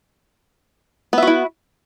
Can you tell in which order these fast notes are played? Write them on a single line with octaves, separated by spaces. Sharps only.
B3 E5 F#4 E4